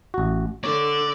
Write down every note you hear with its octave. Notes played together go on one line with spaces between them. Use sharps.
A1 F#4
D3 C#5 D5